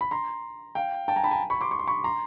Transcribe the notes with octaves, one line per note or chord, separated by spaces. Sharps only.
B5
A#5 C6
F5 G5
G5 A5
G#5 A#5
A5 B5
G#5 A#5
B5 C#6
C6 D6
C#6
C6
B5 C#6
A#5 C6